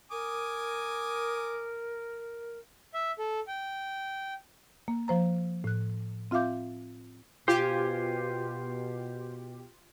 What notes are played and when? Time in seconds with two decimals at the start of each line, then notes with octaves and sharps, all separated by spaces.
0.11 A#4 G#5 D6 D#6
2.94 E5
3.19 A4
3.47 G5
4.88 A#3
5.08 F3 C5 A#5
5.64 A2 F#6
6.31 C4 F4 E5 F5 D6 G6
7.48 B2 F4 G4 C5 G#5